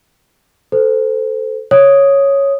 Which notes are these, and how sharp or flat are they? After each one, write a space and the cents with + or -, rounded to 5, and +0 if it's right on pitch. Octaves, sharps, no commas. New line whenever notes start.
A4 +0 C5 -25
C#5 +0 D#6 +0